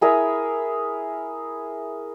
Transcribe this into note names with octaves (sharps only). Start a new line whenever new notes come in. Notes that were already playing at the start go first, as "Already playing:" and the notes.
E4 G#4 A#4 E5